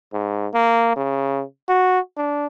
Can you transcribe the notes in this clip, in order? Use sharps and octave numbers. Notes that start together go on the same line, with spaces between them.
G#2
A#3
C#3
F#4
D4